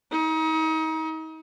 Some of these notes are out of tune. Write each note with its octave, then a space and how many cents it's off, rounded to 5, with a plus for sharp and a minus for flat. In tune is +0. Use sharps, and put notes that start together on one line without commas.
D#4 +35